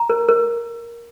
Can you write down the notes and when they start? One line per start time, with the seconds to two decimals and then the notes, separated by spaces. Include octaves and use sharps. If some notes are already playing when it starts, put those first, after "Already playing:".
Already playing: A#5
0.10 A#4
0.29 A#4